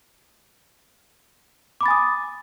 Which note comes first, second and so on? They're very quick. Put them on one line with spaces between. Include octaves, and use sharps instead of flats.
D6 B5 A6 G#5 D#6